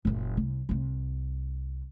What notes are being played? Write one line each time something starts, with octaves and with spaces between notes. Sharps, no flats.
F#1 A#2
C2
C2 C4